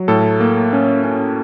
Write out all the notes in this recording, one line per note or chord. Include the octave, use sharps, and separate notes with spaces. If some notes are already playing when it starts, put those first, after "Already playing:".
Already playing: F#3
A2 A4
A#3
C#4
C#4